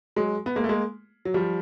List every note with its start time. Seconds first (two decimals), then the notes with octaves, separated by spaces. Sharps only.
0.16 F#3 G#3
0.46 B3
0.56 G#3 A#3
0.64 A3
0.69 G#3 A#3
1.25 F#3
1.34 F3 G3